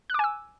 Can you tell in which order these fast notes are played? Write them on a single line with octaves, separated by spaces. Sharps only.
F#6 D6 G#5 E6